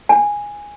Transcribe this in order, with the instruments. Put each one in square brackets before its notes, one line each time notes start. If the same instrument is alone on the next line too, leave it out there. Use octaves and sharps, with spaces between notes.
[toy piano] G#5